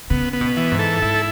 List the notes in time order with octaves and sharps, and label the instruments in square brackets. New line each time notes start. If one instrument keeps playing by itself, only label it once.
[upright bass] C#3 [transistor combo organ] B3
[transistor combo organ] B3
[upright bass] B2
[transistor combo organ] E3
[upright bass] G#2
[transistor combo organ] A4
[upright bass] G#2 [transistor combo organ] E4